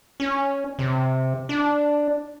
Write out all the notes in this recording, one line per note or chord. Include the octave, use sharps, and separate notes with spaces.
C#4
C3
D4